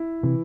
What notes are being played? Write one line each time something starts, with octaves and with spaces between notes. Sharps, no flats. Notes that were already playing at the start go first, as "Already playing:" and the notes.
Already playing: E4
C3 E3